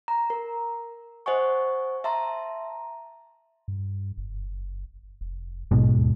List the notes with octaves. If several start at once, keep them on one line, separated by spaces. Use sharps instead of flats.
A#5
A#4
C5 D#5 F#5 G#5 C#6
E5 A5 A#5 C6
G2
F#1
F1
A#1 G#2 B2 G#3
D#2